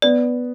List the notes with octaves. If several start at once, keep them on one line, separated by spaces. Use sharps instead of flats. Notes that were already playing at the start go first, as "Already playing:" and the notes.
B3 D5